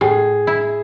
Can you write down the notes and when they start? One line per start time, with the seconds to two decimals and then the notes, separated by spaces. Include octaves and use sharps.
0.01 A2 G#4
0.47 E4